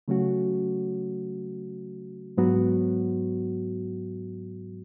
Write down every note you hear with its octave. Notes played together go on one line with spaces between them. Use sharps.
C#3 F#3 A3 C#4 F#4
G#2 F#3 B3 F#4